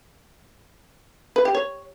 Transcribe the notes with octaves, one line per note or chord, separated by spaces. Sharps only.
B4
G4
C#5